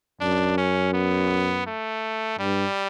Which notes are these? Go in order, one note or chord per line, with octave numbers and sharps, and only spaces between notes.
F#2 D4
C#4
B3
A3
G2 G3